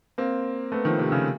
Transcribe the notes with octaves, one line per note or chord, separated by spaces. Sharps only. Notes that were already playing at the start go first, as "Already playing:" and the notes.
A#3 C4
A3 B3
D#3 F3
C3
C#3